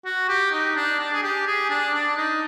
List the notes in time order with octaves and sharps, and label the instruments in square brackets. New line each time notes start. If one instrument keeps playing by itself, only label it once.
[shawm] F#4
G4
D#4
D4
D4
G#4
G4
G#4
D4
D4
D#4